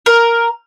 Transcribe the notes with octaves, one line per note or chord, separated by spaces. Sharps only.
A#4